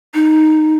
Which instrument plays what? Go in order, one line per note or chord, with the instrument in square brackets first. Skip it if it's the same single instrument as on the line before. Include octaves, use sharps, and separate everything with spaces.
[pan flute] D#4